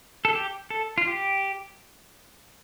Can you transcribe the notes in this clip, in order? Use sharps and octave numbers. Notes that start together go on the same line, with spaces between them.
A4
G4
A4
F4
G4